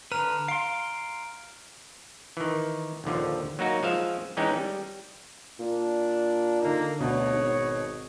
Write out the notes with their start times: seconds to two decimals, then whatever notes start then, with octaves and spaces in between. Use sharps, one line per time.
0.12 D3 B4 A#5 F6 F7
0.48 F5 C6 D7
2.37 D#3 E3
3.04 A#1 D#2 D3 F3
3.59 F#3 A#3 D#4 F#4
3.83 F3 G#3 E5 F5
4.37 E3 G#3 C#4 D#4 G5
4.57 G3
5.59 A#2 D4
6.61 D3 A#3 D#4
7.00 D2 B2 C#5
7.32 G#1